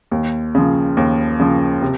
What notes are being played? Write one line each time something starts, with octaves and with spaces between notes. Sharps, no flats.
D#2
C#3 F3
D#2
C#3 F3
C3